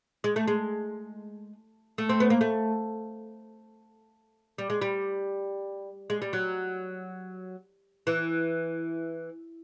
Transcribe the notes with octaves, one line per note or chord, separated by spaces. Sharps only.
G#3
A3
G#3
A3
C4
B3
A#3
A3
G3
G#3
G3
G#3
G3
F#3
E3